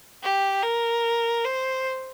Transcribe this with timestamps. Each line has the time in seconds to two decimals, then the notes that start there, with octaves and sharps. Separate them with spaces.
0.23 G4
0.63 A#4
1.44 C5